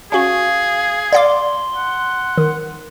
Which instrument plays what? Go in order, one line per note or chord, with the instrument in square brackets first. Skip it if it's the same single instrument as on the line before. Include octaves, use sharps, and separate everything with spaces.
[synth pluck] C#4 F#4 [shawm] G#4 [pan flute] F5
[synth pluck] D5 F5 D6 [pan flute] C6
[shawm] F#5
[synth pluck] D#3